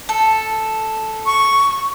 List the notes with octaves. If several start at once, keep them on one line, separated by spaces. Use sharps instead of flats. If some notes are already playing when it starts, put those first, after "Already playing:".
A4
C#6